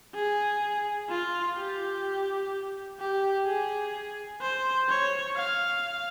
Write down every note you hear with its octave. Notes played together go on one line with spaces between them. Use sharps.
G#4
F4
G4
G4
G#4
C5
C#5
F5